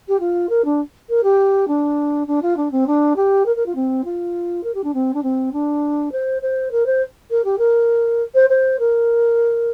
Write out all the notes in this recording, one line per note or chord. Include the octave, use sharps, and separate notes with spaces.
G4
F4
A#4
D4
A#4
G4
D4
D4
F4
D4
C4
D4
G4
A#4
A#4
F4
C4
F4
A#4
G4
D4
C4
D4
C4
D4
C5
C5
A#4
C5
A#4
G4
A#4
C5
C5
A#4